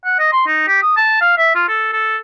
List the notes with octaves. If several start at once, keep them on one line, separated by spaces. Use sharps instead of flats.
F#5
D#5
C6
D#4
G4
D#6
A5
F5
E5
F4
A4
A4